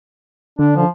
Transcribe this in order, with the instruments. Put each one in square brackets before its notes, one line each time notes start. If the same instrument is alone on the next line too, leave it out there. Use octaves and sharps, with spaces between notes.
[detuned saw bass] D3 [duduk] D4
[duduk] F3